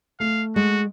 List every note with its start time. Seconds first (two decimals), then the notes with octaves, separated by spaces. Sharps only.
0.20 A3 F5
0.56 G#3 F#4